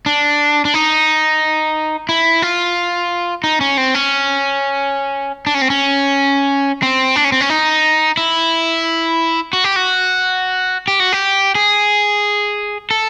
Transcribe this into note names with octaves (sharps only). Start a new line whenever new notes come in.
D4
D4
D#4
E4
F4
D#4
C#4
C4
C#4
D4
C#4
C4
C#4
C4
D4
C#4
C4
C#4
D#4
E4
F#4
G4
F#4
G4
F#4
G4
G#4
A4